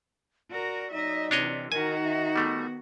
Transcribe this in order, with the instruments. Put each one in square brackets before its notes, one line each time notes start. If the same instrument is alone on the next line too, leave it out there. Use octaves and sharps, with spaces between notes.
[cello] F#4 A#4 [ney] D5
[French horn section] F#3 D#4 [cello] D#5 E5
[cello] C3 E3 [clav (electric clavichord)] D4 C#5 D#5
[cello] D#3 F#4 [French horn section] D#4 [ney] A#4 [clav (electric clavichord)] G#5
[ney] E5
[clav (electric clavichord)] G3 A3 [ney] B3